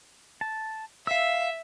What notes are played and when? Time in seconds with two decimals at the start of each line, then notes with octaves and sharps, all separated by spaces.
0.41 A5
1.07 E5 F5 E6